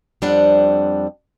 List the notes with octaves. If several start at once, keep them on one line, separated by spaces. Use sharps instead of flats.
F2 G3 C4 D4 F#5